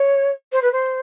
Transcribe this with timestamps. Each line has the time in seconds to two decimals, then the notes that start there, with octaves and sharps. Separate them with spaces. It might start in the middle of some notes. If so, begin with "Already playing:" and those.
Already playing: C#5
0.52 C5
0.62 B4
0.72 C5